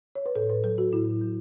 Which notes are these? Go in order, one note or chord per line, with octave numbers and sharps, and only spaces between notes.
C#5
B4
A2 A4
B4
F#3 A4
F#4
A2 E4
F#3